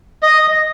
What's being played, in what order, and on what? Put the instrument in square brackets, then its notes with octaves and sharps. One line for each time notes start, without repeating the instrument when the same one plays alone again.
[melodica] D#5